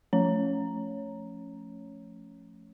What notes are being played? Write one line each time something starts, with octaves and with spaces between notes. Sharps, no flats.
F3 A3 C#4 C#5 A#5